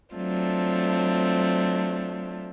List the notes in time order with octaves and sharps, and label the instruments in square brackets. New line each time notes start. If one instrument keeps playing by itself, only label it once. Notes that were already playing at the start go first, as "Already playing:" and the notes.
[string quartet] F#3 A3 C4 D4 F4